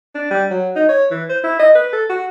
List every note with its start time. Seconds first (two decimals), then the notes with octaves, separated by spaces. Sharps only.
0.15 D4
0.31 G3
0.51 F#3
0.76 D#4
0.89 C#5
1.11 E3
1.29 C5
1.44 E4
1.59 D#5
1.75 B4
1.93 A4
2.09 F#4